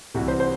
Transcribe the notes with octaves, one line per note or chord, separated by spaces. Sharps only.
C2 C3 E3 G3 F#4
C5
C5